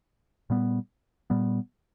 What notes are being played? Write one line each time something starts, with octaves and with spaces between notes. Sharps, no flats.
A#2 G3 B3
A#2 G3 B3